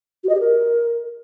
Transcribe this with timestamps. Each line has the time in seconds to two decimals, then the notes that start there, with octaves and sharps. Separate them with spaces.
0.24 F#4
0.29 D#5
0.35 G4
0.40 A#4